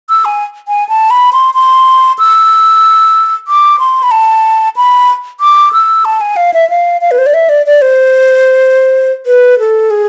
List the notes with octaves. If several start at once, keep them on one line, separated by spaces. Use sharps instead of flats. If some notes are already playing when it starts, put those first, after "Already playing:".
E6
G#5
G#5
A5
B5
C6
C6
E6
D6
C6
B5
A5
B5
D6
E6
A5
G#5
F5
E5
F5
F5
B4
C5
D5
E5
D5
D5
C5
B4
A4
G#4